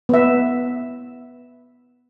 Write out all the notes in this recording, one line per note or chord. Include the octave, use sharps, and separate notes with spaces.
B3 E5